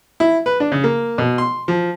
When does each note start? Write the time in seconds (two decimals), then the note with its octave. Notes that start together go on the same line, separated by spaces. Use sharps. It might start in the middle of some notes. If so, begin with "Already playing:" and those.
0.20 E4
0.46 B4
0.60 D4
0.72 C#3
0.84 A#3
1.18 B2
1.38 C6
1.68 F3